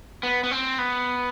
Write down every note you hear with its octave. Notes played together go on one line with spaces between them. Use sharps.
B3
B3
C4
B3